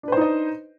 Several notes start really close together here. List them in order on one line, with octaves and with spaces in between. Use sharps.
D4 B4 C5 D#4 D#5